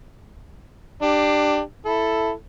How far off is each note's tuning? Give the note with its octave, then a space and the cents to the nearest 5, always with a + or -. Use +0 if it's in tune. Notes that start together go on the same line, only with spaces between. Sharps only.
D4 +20 G4 +0
E4 +5 A4 +0